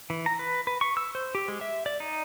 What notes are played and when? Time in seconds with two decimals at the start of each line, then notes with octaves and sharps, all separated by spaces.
0.10 E3
0.26 A#5
0.39 B4
0.67 B4
0.81 C#6
0.97 E6
1.15 C5
1.35 G4
1.48 G#3
1.61 E5
1.86 D5
2.00 D#4